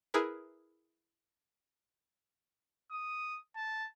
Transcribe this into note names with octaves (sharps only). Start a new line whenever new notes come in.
E4 G#4 A#4 B4
D#6
A5